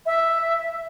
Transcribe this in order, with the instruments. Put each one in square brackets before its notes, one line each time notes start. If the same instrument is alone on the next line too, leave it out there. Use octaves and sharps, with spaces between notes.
[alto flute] E5